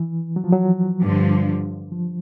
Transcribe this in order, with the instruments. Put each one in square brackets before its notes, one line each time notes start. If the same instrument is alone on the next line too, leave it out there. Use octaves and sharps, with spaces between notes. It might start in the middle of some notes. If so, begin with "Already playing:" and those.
Already playing: [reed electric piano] E3
F#3
F3
F#3
[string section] G2 D3 F3
[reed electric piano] F3